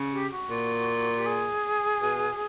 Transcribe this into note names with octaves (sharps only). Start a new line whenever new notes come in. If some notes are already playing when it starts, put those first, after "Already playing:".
Already playing: C#3
G4
F#4
A#2
G4
G#4
B2